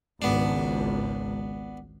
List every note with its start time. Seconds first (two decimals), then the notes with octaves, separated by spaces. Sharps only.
0.22 G#1 C#2 B3 D4